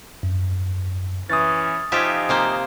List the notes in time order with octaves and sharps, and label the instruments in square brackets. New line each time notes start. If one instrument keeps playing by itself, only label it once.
[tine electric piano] F#2
[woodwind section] E3 C#4 [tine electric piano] D#6 A6
[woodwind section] F3 D#4 G#5 [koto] F4 G4 E5
[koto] C3 A#3 C5